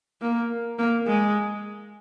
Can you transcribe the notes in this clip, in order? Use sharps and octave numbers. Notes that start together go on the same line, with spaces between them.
A#3
A#3
G#3